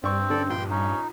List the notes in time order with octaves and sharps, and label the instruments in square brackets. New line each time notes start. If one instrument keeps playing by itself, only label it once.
[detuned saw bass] G2 [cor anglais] C4 [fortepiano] D5 C#6
[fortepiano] D3 C#4 [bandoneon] A4 D5
[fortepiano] A#1 [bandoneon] G5 C6
[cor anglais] C#4 [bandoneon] D#4